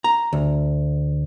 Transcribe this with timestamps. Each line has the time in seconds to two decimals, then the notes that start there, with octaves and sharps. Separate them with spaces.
0.04 A#5
0.33 D2